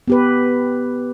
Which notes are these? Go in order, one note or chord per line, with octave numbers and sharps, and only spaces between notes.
B3 G4 B4